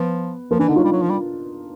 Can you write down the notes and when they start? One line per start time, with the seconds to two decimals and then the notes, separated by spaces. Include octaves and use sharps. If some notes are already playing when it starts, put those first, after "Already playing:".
Already playing: F3 B3
0.51 F3 A#3
0.59 E3 D4
0.67 D3 D#4
0.76 F#3 F4
0.84 G3
0.93 F#3
1.02 F3
1.10 G3